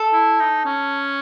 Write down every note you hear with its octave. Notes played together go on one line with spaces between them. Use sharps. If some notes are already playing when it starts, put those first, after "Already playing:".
Already playing: A4
E4
D#4
C#4